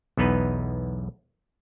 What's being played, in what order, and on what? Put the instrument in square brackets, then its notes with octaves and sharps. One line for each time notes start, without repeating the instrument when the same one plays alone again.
[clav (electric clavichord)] B1 E2 B3 D#4 B4